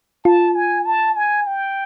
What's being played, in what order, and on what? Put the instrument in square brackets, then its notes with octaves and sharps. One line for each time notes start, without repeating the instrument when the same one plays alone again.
[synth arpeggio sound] F4 [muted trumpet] A5
[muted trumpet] G#5
A5
G#5
G5